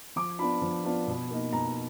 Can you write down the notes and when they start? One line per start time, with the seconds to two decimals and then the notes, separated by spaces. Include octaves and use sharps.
0.16 F3 D6
0.39 B3 D4 F4 B5
0.62 F3
0.84 B3 D4 F4
1.07 B2
1.31 A#3 D#4
1.53 B2 A#5